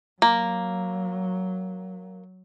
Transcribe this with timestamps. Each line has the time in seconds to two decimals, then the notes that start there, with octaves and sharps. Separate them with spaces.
0.22 F#3 A#3